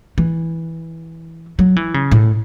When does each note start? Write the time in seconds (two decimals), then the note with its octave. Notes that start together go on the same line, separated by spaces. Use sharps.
0.18 E3
1.59 F#3
1.76 E3
1.94 C#3
2.12 A2